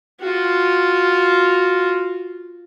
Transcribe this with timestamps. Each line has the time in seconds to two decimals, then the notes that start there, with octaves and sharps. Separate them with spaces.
0.20 F4 F#4